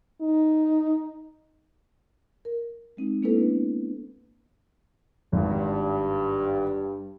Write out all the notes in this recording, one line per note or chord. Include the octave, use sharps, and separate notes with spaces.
D#4
A#4
G#3 C4 D#4
A#3 B3 D4 E4 A4 B4
G#1 G2